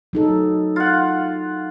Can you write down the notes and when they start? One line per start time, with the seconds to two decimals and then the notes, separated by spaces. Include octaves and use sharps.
0.13 F#3 D#4 A4
0.76 F4 F#5